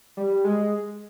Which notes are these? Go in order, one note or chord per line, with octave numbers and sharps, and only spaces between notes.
G3
G#3